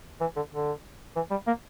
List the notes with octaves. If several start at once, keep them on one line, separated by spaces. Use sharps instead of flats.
E3
D3
D3
E3
G3
A#3